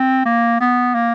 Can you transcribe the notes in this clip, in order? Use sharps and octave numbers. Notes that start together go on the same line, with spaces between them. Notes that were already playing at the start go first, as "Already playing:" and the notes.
Already playing: C4
A#3
B3
A#3